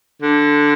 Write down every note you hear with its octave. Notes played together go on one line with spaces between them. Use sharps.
D3